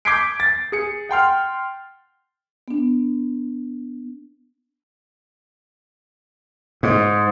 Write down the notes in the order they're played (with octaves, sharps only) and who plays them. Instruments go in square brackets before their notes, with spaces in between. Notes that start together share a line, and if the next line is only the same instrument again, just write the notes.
[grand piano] D6 G6 G#6 B6 C7 D7
A6
G#4 C#7
F#5 G5 C6 F6
[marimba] B3 D4
[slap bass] G#2